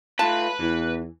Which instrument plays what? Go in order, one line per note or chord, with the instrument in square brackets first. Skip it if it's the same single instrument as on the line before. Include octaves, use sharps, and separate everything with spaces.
[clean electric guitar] A3 F4 [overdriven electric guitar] B4 [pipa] A5
[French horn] E2 [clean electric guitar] E3